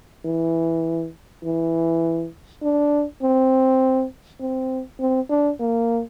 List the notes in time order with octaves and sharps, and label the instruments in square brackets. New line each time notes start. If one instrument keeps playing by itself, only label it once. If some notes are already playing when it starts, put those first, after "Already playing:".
[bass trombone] E3
E3
D4
C4
C4
C4
D4
A#3